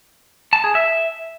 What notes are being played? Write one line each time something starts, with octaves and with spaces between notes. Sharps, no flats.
A5
G#4
E5